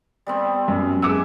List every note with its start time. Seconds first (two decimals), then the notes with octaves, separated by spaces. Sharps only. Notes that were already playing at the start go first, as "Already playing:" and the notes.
0.26 G3 B3 C4
0.68 F#2
1.02 G#3 E5 F#5 G#5 D6 E6